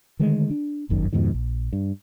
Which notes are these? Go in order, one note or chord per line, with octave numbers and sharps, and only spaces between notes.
D3 D#3 G#3 A3
D4
D1 G1 F#2 D#3
F2 G#2 B2 D#3
A#1
G2